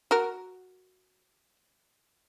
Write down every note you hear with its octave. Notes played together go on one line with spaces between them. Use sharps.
F#4 A#4